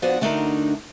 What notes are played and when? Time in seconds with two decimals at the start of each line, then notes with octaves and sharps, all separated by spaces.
0.02 F3 B3 D4 F#4 D5 F#5
0.21 D3 A3 D4 D#4 F#4 A#4